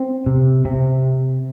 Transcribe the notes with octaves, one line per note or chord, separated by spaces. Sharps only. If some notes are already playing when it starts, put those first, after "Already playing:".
Already playing: C4
C3
C3